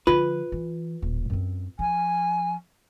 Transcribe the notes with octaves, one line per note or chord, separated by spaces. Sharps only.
D3 F3 F4 B4
E3
D#1 A1
F#2 C4
F3 G#5